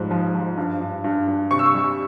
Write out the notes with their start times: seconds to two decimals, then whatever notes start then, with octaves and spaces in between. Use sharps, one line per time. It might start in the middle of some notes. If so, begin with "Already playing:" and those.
Already playing: G#2 F3 G3
0.11 F3
0.35 F3
0.57 G2
0.81 G2
1.04 G2
1.28 G2
1.51 C3 C#6
1.59 E6
1.66 C#6
1.74 G3